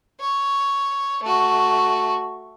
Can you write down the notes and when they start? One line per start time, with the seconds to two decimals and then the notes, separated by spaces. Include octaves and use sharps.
0.20 C#5
1.22 A3 F#4